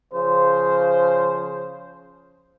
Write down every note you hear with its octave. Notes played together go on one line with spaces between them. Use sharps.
C#3 F3 C5